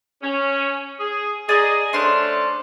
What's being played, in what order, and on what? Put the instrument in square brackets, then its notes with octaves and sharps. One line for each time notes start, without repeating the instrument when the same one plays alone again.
[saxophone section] C#4
G#4
[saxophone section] G#4 [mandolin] D5 D#5 A#5
[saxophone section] A3 C#4 D4 [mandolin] C5 C6